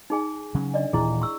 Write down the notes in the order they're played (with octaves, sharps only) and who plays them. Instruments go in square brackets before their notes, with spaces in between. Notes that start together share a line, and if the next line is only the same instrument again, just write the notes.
[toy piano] D#4 G#4 G#5
[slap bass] C#3 F#3 C#4
[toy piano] D4 D5 D#5
[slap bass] D#1 A#2 E3 [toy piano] E4 G#4
[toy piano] C#6 E6